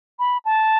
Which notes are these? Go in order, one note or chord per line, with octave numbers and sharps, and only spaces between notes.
B5
A5